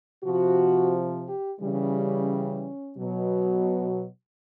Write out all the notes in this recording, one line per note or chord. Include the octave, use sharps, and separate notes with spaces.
C3 F3 F#4
G4
C#3 E3 G3
C#4
C#4
B2 F#3